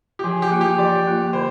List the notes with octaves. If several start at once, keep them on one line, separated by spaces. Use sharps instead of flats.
G4
F3 G#4
G4
A#3 F4
G4
F3 D5
A#3 F4
D3 C5